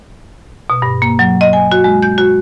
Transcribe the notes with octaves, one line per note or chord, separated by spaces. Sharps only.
B2
G2
A#3
F#3
D#5
G#5
F#4
G#3
G6
F#4